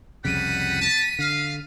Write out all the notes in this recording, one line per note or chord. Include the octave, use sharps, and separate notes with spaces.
C2 F2 C#3 G3 F#5 B6 D#7
A5
D3 F5